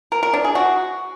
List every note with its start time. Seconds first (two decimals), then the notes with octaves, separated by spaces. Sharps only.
0.12 A#4
0.23 A#4
0.34 D4
0.44 G#4
0.55 F#4